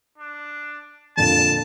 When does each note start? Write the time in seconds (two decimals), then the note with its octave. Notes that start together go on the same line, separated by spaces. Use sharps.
0.18 D4
1.17 F2 A#2 D3 A5